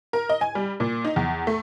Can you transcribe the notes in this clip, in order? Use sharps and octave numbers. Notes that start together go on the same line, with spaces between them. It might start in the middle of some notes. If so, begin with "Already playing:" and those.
A#4
D#5
G#5
G3
A#2
D#4
E2
A3